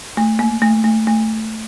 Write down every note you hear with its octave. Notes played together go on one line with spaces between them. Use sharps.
A3
A#3
A3
A3
A3